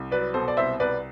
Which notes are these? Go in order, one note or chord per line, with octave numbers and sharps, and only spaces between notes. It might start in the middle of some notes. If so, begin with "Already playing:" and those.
Already playing: C2
F#3 B4 D5
B2 A4 C5
D5
C2 C5 E5
C2 B4 D5